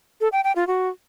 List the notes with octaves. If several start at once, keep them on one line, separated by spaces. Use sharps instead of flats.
A4
G5
G5
F4
F#4